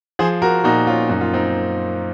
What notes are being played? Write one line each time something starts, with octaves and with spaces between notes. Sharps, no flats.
F3 G#4 C5
F#4 A#4
A#2 D#4 F#4
C#4 F4
F#2 D#4
F4
C4 D#4